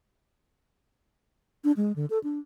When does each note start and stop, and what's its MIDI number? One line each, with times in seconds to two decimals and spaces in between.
1.64 1.72 62
1.77 1.92 56
1.96 2.06 50
2.10 2.19 69
2.24 2.39 62